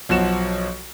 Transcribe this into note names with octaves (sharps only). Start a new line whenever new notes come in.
B1 F3 F#4 E7